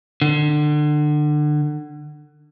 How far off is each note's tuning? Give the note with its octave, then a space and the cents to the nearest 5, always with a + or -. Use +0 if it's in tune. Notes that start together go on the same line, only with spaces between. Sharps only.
D3 +30